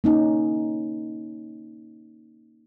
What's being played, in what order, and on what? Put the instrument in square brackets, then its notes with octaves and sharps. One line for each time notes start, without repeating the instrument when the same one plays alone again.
[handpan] A#3 C#4 D#4